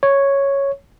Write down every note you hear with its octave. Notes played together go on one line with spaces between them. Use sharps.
C#5